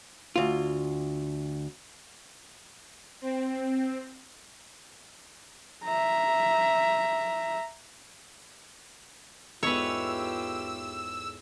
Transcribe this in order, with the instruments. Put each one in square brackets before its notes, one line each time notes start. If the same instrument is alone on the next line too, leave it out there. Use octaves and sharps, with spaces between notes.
[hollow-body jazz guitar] D2 F4
[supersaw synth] C4
[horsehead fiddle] E5 A#5
[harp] E2 G#2 A4 [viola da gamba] F4 G4 [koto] B4 C#5 [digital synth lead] E6